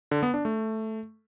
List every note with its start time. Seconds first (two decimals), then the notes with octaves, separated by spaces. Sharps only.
0.11 D3
0.23 B3
0.34 D4
0.45 A3